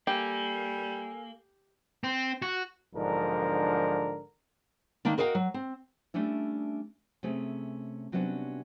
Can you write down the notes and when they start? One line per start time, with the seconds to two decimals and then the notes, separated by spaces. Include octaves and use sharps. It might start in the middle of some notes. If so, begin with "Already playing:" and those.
0.07 G3 A#3 G4 A4 G#5 E6
2.04 C4
2.42 F#4
2.95 B1 G#2 D3 F3 D4 A#4
5.05 D#3 A#3 D4
5.18 F#4 A#4 D#5 F5 G5
5.35 F#3
5.54 C4
6.14 G3 A3 C#4 D4 E4
7.23 C3 A3 C#4 G#4
8.12 C3 F#3 G3 B3 C#4 D4